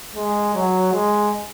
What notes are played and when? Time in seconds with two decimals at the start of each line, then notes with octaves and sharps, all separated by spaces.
0.15 G#3
0.54 F#3
0.93 G#3